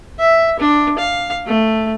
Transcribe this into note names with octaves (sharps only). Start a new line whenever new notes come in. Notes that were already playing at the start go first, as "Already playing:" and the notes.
E5
D4
F5
A3